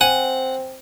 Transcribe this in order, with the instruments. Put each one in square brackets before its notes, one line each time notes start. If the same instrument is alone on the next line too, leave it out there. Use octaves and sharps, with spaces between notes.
[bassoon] C4 [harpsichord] F#5 [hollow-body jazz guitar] G#5